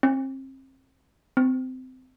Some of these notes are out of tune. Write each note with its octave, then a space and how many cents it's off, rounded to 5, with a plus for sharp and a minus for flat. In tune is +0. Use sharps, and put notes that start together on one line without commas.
C4 +35
C4 -25